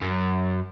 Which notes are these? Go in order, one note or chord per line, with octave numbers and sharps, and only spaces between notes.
F#2